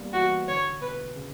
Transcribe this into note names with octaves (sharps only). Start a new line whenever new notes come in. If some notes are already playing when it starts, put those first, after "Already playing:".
Already playing: G3 A#3 B3
E3 F#4
D3 C#5
B2 B4
C#3